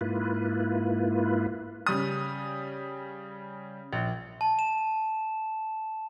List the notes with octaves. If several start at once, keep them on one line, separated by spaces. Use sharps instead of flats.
G#2 A#3 E4 F4 B4
C#3 G3 D#6
A#1
A5
E7